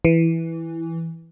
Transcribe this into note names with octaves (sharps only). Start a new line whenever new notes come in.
E3